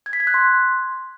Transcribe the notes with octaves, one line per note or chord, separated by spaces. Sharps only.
G#6
B6
G#6
F#6
C6